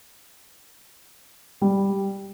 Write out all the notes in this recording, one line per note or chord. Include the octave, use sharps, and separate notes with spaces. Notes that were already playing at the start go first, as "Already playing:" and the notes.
G3